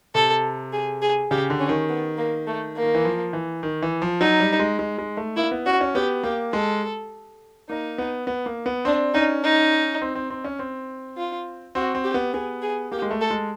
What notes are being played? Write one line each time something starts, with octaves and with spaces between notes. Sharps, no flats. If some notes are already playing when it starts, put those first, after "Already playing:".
C3 A4
G#4
G#4
C#3 G4
D3
C#4
D#3
B3
A#3
A3
A#3
D#3
E3
F3
E3
D#3
E3
F3
F#3 D#4
G3
G#3
G#3
G#3
A3
A#3 E4
B3
C#4 F#4
C#4
B3 G4
A#3 G4
G#3 A4
A#3 D#4
B3
B3
A#3
B3
C4 D4
C#4 D#4
D#4
C4
C4
C4
C#4
C4
F4
C4 F#4
C4
G4
B3
B3 G#4
G#4
A#3 G4
G#3
A3
A4
G#3